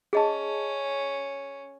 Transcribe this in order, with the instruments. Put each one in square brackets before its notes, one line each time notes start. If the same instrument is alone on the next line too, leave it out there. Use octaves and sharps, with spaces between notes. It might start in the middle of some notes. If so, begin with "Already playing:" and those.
[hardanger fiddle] C#4 [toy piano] G#4 D#5 A5